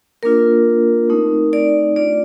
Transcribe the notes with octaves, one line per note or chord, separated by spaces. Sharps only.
A#3 D4 F4 A#4
A3 C4 D#4
D5
A3 D4 F4 D5